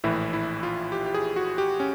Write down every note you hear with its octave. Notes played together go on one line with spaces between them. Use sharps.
A#1 A2 E3 E4
E4
F4
G4
G4
G#4
F#4
G4
C#4